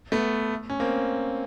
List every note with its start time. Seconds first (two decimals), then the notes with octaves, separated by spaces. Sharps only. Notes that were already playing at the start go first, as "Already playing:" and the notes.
0.12 A3 B3
0.70 C#4
0.80 A#3 C4